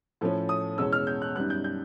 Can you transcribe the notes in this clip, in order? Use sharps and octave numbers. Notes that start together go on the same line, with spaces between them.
A2 F3 A3 C#4
D#6
E2 B2 G#3 C#4 E6
F6
G6
F#6
F#2 D#3 G3 B3 F#6
G6
G6